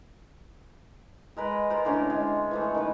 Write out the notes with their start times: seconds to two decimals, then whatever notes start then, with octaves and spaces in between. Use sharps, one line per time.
1.37 G#3 A#4 B4
1.70 F4 A#4 C5
1.85 A2 D3 C#4 C6
2.10 G#3
2.51 E3 F3 A3
2.75 D#3 B4